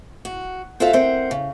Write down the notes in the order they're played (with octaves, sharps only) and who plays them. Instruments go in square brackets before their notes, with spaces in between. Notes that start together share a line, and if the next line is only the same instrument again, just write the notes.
[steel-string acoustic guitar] F#4
F4 F#4 A4 C5 E5 F5
C4 A#4 C5 F#5
C#3